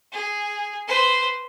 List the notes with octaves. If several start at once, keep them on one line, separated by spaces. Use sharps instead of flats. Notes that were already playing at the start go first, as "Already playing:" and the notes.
G#4
B4 C5